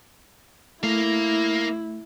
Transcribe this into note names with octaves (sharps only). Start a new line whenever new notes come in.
A3 A#3 E4 F5